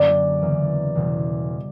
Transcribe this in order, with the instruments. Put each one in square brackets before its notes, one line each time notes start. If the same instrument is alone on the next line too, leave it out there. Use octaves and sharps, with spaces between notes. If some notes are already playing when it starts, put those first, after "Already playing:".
Already playing: [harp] F#2 D3 A#3 C#4 F#4 [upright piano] D5
[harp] E2 C#3 E3 A#3
E1 E2 B2 G3